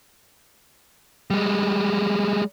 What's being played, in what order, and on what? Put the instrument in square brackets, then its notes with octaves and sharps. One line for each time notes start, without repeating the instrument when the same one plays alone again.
[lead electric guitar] G3 G#3